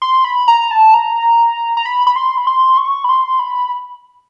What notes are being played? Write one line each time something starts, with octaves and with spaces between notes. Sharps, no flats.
C6
B5
A#5
A5
A#5
A#5
B5
B5
C6
B5
C6
C#6
B5
C6
B5